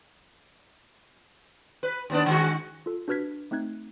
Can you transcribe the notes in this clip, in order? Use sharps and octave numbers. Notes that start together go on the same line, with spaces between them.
B4
D#2 B3 D4
D#3 G#3 F#4
F4 A4
D4 F#4 B4 F6 G#6 B6
A3 C4 D#4 F#6 G#6